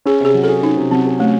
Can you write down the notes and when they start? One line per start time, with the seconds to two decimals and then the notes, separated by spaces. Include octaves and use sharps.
0.05 C#4 G#4
0.20 C3 G#4
0.34 F#3
0.44 G#4 A4
0.62 C#4 D#4
0.77 C3
0.91 F#3 C4
1.06 G#4
1.19 A3 C#4